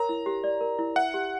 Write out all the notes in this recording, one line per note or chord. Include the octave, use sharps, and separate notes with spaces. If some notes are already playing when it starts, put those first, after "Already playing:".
Already playing: A#4 C#5 A#5
E4
G4
D5
A#4
E4
E5 F#5
G4